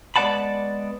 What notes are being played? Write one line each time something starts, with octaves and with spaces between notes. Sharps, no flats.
G#3 B3 D5 F#5 A5 B5